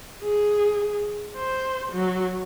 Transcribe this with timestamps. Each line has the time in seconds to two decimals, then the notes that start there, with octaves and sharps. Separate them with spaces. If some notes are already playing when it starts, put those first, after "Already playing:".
0.22 G#4
1.37 C5
1.92 F#3